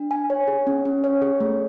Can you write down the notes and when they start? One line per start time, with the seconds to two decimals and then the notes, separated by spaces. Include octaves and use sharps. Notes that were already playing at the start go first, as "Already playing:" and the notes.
Already playing: D4
0.11 G#5
0.30 C#5
0.48 G#4
0.67 C#4
0.85 C#4
1.04 C#5
1.22 G#4
1.40 A3